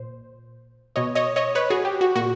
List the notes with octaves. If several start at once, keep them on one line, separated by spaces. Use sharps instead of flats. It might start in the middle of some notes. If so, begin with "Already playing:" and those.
Already playing: A#2 C5
B2 C#5 D#5
C#5 D#5
C#5 D#5
B4 C#5
F#4 G#4
G4
F#4
A#2 F#4